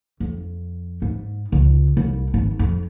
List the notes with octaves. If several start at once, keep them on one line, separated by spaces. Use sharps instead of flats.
F2
G#2
C#2
C2
G#1
F2